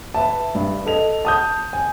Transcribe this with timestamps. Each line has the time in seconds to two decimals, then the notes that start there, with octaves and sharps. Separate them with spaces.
0.14 B4 E5 A5
0.55 G2
0.86 A4 D#5 F7
1.25 A5 D#6 G6
1.73 G#5